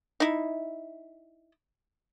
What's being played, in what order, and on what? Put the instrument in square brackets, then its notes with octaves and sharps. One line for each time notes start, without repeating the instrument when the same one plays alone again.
[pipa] D#4 E4